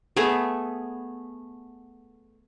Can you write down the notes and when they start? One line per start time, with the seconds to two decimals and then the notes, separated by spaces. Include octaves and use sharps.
0.17 A3 B3 G#4